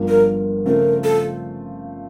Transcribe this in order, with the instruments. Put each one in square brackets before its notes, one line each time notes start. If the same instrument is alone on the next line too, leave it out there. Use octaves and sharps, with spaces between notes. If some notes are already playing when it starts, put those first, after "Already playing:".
Already playing: [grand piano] G1 G2 D3 F3 A#3
[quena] A#4
[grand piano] C#3 F3 A3 C4 F4 [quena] A#4
[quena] A4